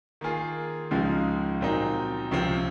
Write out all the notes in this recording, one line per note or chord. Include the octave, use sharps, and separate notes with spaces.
D#3 A#3 F4 G#4
C#2 C#3 F3 G#3 D#4
A#2 F#3 C4 D#4
C#2 C3 F3 C4